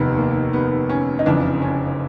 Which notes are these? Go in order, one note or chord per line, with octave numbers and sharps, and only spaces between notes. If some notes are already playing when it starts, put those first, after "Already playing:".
Already playing: F1 D#2 D#3 B3
A#3
B3
C#4
D#4
F#1 F2 C#3 E3 D4
C#4